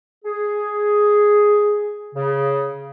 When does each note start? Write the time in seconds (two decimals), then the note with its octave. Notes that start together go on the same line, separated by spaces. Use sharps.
0.25 G#4
2.14 C#3